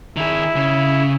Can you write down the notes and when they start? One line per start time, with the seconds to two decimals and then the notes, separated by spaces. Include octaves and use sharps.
0.16 D#3 E4 G#4
0.56 C#3